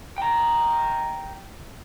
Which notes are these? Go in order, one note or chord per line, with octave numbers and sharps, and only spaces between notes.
G5 A#5